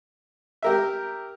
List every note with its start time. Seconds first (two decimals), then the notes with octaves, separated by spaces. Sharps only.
0.62 G4 A#4 E5